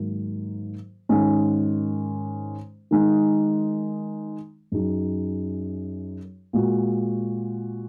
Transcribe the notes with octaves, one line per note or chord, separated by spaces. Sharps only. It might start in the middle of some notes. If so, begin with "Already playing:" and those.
Already playing: G#2 D#3 F#3 A#3 D#4
G#2 D#3 G#3 C#4
D#3 G#3 D#4
F#2 F#3 D#4 G#4
A#2 G#3 F#4